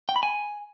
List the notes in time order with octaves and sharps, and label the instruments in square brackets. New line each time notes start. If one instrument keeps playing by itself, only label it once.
[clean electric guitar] G5
B5
G#5